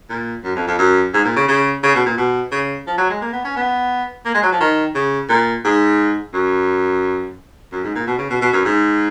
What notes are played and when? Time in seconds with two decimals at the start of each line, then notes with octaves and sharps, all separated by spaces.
0.10 A#2
0.44 F#2
0.56 F2
0.67 F2
0.79 F#2
1.14 G#2
1.25 A#2
1.36 C#3
1.48 C#3
1.83 C#3
1.95 B2
2.06 A#2
2.17 B2
2.52 C#3
2.87 F3
2.98 F#3
3.10 G#3
3.21 A#3
3.32 B3
3.44 C#4
3.56 B3
4.25 A#3
4.34 G#3
4.43 F#3
4.52 F3
4.60 D#3
4.95 C#3
5.29 A#2
5.64 G#2
6.33 F#2
7.72 F#2
7.84 G#2
7.95 A#2
8.07 B2
8.18 C#3
8.30 B2
8.41 B2
8.53 F#2
8.65 G#2